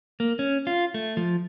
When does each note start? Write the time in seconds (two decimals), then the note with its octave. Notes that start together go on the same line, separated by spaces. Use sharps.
0.20 A#3
0.39 C#4
0.67 F4
0.94 A3
1.17 F3